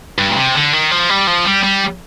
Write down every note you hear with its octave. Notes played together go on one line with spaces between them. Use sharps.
G2
A#2
C3
D3
D#3
F3
G3
F3
G3
G3